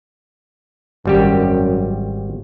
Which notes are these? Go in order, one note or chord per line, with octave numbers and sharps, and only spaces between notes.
G#1 F#2 G3 G4